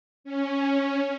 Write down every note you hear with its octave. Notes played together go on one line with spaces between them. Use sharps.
C#4